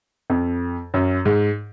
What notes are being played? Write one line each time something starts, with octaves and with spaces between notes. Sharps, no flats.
F2
F#2
G#2